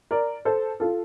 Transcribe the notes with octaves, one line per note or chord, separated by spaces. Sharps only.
A#4 D5
A4 C5
F4 A4